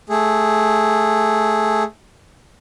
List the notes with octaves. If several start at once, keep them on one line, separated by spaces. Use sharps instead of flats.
A3 G#4